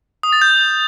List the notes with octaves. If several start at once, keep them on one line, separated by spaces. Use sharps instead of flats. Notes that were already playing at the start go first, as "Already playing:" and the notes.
D#6
A6
G6